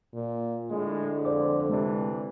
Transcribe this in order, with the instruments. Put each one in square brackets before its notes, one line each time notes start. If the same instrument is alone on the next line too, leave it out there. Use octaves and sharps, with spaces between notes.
[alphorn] A#2
[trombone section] A2 G#3 [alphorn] D3
[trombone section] F2 [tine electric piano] C5 D5 D6
[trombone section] C3 E3 D4 [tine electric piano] G#3